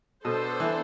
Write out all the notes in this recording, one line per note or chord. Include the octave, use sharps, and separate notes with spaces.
B2 B3 D4 A4 C5
E3